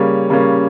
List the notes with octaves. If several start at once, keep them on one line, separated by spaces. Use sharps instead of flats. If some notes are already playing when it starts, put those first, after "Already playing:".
Already playing: C#3 G3 A#3 C#4
C#3 G3 A#3 C#4